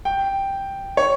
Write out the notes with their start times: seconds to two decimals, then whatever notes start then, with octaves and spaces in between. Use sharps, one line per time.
0.05 G5
0.97 C#5